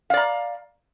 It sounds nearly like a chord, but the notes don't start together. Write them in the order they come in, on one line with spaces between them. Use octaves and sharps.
F5 D5 A#5